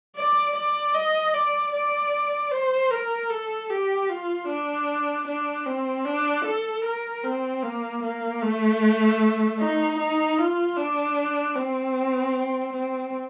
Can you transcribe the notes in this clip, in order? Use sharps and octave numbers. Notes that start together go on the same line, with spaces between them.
D5
D5
D#5
D5
D5
C5
A#4
A4
G4
F4
D4
D4
C4
D4
A4
A#4
C4
A#3
A#3
A3
D#4
D#4
F4
D4
C4
C4